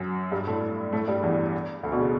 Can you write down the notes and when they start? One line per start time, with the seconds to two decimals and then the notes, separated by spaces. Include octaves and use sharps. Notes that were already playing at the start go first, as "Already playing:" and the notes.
Already playing: F#2 F#3
0.32 G2 G3
0.47 A2 A3
0.93 A2 A3
1.08 G2 G3
1.23 E2 E3
1.83 D2 D3
1.92 B2
1.99 C#3